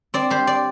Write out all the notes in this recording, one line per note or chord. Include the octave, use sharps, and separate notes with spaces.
C4 D5
G3 C5
D5